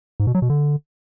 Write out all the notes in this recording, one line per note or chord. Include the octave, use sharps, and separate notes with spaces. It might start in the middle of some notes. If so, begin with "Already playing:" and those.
G#2
B2
F#3
B2
D3